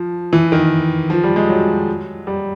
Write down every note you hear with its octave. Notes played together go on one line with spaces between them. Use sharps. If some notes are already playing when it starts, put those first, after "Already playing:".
Already playing: F3
E3
D#3
F3
G3
G#3
F#3
G3